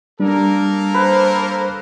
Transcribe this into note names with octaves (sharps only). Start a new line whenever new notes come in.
G3 A#3 D4 A4 A#4
B4 C5